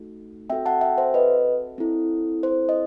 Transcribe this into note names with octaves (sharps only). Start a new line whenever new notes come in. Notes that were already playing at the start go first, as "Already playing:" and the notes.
Already playing: A3 D#4 F#4 A4
C4 F#4 A4 E5 G5
F#5 A5
E5 G5
C5 E5
B4 D#5
C4 E4 A4
C5
D#5